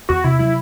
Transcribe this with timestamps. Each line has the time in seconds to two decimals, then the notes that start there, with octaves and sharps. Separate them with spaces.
0.09 E2 F#4
0.24 C3 E4
0.39 F#3 E4